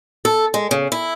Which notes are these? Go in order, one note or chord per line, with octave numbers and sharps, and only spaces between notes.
A4
G#3
C#3
E4